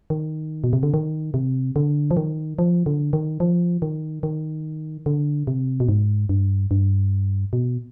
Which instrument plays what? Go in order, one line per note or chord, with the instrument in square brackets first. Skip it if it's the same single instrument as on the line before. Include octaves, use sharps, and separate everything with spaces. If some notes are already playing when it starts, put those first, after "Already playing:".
[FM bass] D#3
B2
C3
D3
D#3
C3
D3
F3
D#3
F3
D3
D#3
F3
D#3
D#3
D3
C3
B2
G#2
G2
G2
B2